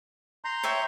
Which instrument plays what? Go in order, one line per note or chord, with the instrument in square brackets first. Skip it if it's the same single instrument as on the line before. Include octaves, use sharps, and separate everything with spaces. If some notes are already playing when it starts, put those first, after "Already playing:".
[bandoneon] A#5 C6 G6
[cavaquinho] C#5 E5 G5